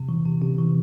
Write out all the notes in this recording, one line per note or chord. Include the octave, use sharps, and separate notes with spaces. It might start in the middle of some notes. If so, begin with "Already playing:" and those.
Already playing: C3
E3
C3
C3
E3